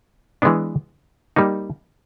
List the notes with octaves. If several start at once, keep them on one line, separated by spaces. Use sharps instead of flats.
E3 G#3 B3 D4
G3 A#3 D#4